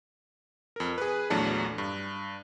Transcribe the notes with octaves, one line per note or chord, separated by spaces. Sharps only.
F2 A#4
G#4 B4
A#1 E2 F#3 A3 D4 A5
G2